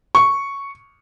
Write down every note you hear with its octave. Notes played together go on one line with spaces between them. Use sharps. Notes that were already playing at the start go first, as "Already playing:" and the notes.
C#6